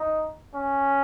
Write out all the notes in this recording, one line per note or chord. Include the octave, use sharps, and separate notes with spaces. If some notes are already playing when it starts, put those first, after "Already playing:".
Already playing: D#4
C#4